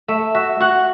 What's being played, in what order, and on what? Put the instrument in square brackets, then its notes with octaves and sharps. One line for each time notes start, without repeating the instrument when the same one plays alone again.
[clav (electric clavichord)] A3 [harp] E5
[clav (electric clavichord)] F#4 [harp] E5
[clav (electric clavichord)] F#4 [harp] F#5